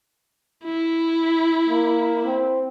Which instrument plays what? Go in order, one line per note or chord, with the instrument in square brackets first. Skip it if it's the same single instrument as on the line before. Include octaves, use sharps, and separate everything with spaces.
[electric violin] E4
[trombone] A#3
C4